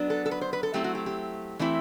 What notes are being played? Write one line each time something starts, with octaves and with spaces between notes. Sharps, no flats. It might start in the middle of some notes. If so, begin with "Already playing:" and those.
Already playing: F#3 B3 D4
A4
A4
B4
C5
B4
A4
F#3 A3 C4 E4 G4
F#4
G4
G4
E3 A3 C4 E4